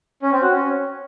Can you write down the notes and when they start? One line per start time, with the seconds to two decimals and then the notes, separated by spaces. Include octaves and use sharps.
0.22 C#4
0.32 C4
0.42 F#4
0.52 C#4